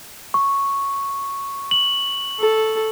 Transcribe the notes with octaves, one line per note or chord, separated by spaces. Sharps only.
C#6
F#7
A4